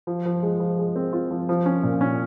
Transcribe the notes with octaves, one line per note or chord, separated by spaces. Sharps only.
F3
F3
G#3
F3
G#3
C4
F4
F3
F3
C#4
A#2
C#4